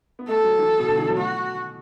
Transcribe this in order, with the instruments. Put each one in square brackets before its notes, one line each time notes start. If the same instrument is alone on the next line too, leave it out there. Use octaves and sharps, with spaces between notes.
[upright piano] B3
[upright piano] A3 [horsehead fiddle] A4
[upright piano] F#3
E3
B2
D3
E3
F#3
[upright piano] A3 [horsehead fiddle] F#4